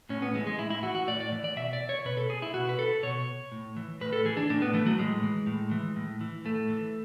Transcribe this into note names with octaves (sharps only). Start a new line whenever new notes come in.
A2 C#4
B3
E3 G#3
G#3
A2 E4
E4
E3 F#4
F#4
A2 D5
D5
E3
D5
B2 E5
D5
C#5
B2 B4
A4
G#4
E4
B2 F#4
B4
A4
B2 C#5
A2
E3
A2 B4
A4
E3 G#4
D4
A2 D4
B3
E3 A3
F#3
A2 G#3
E3
A2
E3
A2
E3
A2 A3
E3